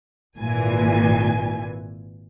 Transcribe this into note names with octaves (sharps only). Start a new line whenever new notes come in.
G#1 A#2 E3 G#5